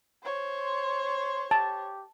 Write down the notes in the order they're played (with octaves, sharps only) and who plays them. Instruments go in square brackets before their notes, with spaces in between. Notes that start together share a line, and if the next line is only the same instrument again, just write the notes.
[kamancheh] C5 C#5
[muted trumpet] C6
[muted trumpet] G4 [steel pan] A5